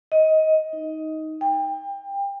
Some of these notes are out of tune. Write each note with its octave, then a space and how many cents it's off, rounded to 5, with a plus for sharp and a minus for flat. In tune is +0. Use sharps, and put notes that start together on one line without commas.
D#5 +20
D#4 +10
G5 +30